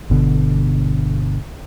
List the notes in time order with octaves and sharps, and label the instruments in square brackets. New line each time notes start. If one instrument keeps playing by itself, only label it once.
[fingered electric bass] G1 B2 D3